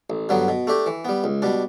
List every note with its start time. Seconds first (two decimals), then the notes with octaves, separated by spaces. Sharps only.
0.10 A1
0.29 G2 D3 F#3 B3
0.48 B2
0.67 A3 D4 G4
0.86 E3
1.05 G3 B3
1.24 C#2
1.42 B2 G3 D4